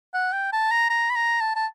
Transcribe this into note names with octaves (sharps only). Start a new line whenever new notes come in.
F#5
G5
A5
A#5
A#5
B5
A#5
A5
A5